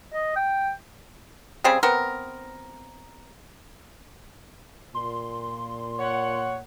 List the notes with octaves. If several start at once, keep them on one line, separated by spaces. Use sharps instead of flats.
D#5
G5
C#3 G3 C4 G#4
B3 C4 A#4
A#2 C6
C#5 F#5